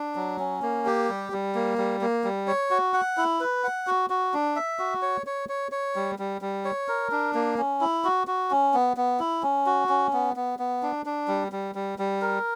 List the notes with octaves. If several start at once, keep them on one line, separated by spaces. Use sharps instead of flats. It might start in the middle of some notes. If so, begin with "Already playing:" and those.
Already playing: D4
F#3
C#4
A#3
G4
G3
G3
A#3
G3
A#3
G3
C#5
F#4
F#5
E4
B4
F#5
F#4
F#4
D4
E5
F#4
C#5
C#5
C#5
C#5
G3
G3
G3
C#5
A#4
D4
A#3
C#4
E4
F#4
F#4
C#4
B3
B3
E4
C#4
F#4
C#4
B3
B3
B3
D4
D4
G3
G3
G3
G3
A#4